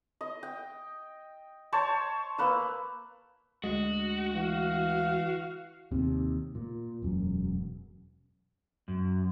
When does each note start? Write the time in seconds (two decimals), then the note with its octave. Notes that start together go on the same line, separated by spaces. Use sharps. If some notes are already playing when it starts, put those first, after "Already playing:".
0.21 D#5
0.43 G5
1.73 C5 C#5 A5
2.38 A#3 B4 E6
3.64 D2 G#3 F#4
4.35 E3 F5
5.91 D#2 C3
6.55 A#2
7.02 E1 F#2
8.88 F#2